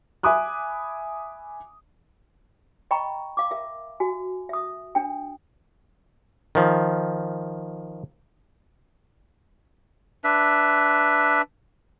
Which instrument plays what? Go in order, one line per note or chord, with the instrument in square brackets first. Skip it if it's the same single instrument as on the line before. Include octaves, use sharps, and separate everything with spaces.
[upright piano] E5 G#5 B5 D6 D#6 F#6
[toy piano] D#5 G5 A#5 B5 C#6
F5 D6
A#4 E5
F#4 G#5
E5 D#6
D4 G5
[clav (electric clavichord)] D#3 F3
[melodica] D4 B4 E5